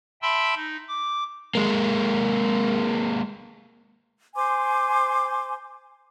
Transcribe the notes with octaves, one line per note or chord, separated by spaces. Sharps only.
E5 G5 A5 B5 C6 E6
D#4
D6
G#3 A#3
C5 G#5 C6 D6